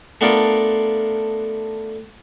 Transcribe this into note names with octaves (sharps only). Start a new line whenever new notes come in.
A3 B3 D4 F4 A4 A#4